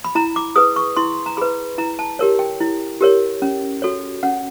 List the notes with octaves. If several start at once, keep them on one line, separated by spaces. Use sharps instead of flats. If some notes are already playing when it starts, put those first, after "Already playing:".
B5
E4 A#5
D6
G#4 B4 D#6
C#6
E4 C6
A#5
G#4 B4 B5
E4 A#5
A5
G4 A#4 C#5
G5
E4
G4 A#4 C#5
C#4
F#4 A4 C#5
C#4 F#5